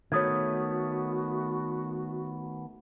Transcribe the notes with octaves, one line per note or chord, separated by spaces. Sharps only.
D#3 A3 B3 F#4 C#5 D#6 G#6